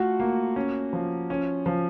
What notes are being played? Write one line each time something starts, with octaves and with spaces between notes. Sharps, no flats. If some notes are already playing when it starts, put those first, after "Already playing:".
Already playing: A3 F4 F#4
A#3
C#4
F3
C#4
F3